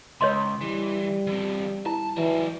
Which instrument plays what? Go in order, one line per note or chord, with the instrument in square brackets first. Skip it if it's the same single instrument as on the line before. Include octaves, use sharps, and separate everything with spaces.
[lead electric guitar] C#2 [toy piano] C#5 D#5 C6
[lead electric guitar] E3 [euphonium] G3
[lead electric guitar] E3 C4
[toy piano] E4 [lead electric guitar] A5
[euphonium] E3 [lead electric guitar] G3 F#4